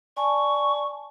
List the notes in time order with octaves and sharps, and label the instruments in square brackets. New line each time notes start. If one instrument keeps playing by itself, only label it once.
[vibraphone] D5 G#5 A5 [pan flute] C#6